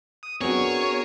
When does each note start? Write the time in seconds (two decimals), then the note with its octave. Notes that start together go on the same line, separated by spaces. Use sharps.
0.23 D#6
0.41 B3 C4 D4 F#4 G#4 A#4 C#5